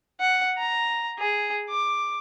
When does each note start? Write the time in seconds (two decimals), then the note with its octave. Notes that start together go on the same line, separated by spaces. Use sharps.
0.21 F#5
0.58 A#5
1.19 G#4
1.70 D6